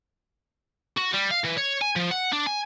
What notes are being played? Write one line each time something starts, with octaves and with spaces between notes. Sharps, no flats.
F#4
G3
F5
E3
C#5
G#5
F3
F#5
D4
G#5